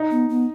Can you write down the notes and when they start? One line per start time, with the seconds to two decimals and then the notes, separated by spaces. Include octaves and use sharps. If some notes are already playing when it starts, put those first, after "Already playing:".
Already playing: D#4
0.11 B3
0.29 B3